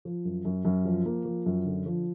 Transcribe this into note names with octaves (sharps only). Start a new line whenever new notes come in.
F3
F#2
F#2
F#2
F3
A#3
F3
F#2
D3
F3